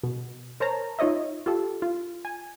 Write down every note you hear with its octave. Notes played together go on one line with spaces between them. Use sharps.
B2
A#4 C5 C#5 A5 A#5
D#4 F4 C#5 D#5 E5
F4 G4 A4
F4
G#5